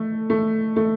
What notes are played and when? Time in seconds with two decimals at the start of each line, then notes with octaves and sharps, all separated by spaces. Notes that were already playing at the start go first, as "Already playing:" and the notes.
Already playing: A3
0.30 A3
0.76 A3